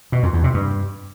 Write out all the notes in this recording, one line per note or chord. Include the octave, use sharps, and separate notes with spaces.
B2
F2
E2
C3
G2